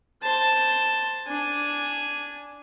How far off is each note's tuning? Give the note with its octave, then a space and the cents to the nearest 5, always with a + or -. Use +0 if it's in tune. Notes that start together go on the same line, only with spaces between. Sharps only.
C5 +0 A5 +0
D4 -10 G#5 +0